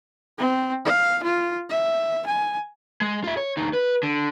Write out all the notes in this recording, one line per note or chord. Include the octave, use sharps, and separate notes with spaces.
C4
F5
F4
E5
G#5
G#3
F4 E5
C#5
D2 D#4
B4
D3